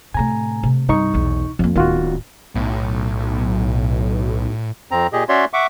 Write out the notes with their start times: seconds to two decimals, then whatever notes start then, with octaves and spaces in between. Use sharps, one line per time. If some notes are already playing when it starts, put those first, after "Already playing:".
0.14 A2 C3 G#5 A#5
0.63 C3 A3
0.89 C2 G2 D#4 C#6
1.14 B1 E2
1.59 F2 F3 A#3
1.76 D1 D#3 B3 F4 F#4
2.55 B1 A2
4.91 F2 C4 A#5
5.13 A#2 G4 G#4 D#5
5.29 C#4 F#4 C#5 D5 E5 C6
5.53 E5 F#5 C#6 D6